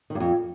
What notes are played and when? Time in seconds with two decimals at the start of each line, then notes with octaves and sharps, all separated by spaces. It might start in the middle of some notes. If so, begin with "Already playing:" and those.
0.10 D#3
0.15 G2
0.20 F2